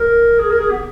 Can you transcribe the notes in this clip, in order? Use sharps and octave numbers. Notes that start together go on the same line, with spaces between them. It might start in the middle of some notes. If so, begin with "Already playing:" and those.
Already playing: A#4
G#4
A#4
G#4
B3